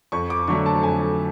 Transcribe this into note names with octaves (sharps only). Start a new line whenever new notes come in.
F2 C#6
D6
D3 F#3 A3 C#6
A5
F2 G#5